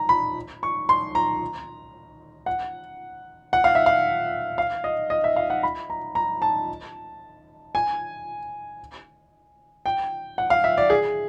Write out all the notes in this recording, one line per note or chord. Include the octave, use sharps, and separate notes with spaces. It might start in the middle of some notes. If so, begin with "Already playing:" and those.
Already playing: A#5
B5
C#6
C6
A#5
F#5
F#5
F5
E5
F5
F5
D#5
D#5
E5
F5
F#5
B5
A#5
A#5
A5
G#5
G5
F#5
F5
E5
D5
G#4